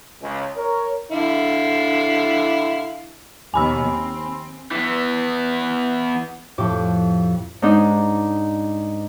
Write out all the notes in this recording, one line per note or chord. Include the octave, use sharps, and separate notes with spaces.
C#2
A#4 C#5
D3 E4 F5
D#2 B2 G#5 B5 E6
C4
E3 B3
F2 A2 G4 D6
G#2 D4 D#4